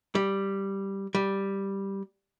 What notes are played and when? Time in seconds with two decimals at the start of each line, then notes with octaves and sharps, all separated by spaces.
0.15 G3
1.15 G3